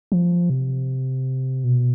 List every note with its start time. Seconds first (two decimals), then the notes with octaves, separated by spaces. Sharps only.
0.12 F3
0.50 C3
1.64 B2